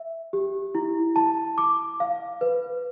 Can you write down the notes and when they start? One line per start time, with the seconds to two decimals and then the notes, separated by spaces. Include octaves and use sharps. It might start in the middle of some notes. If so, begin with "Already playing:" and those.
Already playing: E5
0.33 G4
0.75 E4
1.16 A5
1.58 D6
2.00 F5
2.41 B4